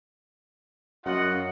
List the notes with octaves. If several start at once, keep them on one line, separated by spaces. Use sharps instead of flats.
F#2 F4 D#5 F#5